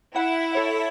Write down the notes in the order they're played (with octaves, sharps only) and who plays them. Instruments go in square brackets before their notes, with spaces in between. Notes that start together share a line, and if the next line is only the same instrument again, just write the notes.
[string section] E4 [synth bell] F#5
[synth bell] A4 C#5 E5